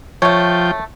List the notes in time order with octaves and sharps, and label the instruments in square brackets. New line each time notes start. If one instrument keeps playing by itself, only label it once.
[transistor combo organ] F3 G5 [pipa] A3 E5 [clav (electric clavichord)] C#5